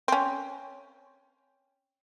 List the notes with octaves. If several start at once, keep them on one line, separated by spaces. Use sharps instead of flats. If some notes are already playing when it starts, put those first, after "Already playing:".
C4 C#4